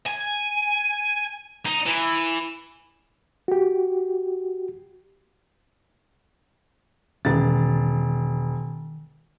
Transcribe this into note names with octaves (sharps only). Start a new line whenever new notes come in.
G#5
D#4
E3
F#4 G4
E1 D#3 C#4 A6